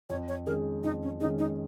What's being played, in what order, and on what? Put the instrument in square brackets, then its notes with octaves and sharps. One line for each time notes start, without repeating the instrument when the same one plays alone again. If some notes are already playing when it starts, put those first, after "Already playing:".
[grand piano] F2 [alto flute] C#5
[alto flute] C#5
[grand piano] D#3 G#3 C#4 G#4 [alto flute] A#4
[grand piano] F2 [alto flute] D#4
[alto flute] C#4
[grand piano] D#3 G#3 C#4 G#4 [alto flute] D#4
[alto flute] D#4